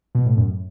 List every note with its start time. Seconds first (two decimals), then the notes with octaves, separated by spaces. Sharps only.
0.15 B2
0.26 A2
0.37 F#2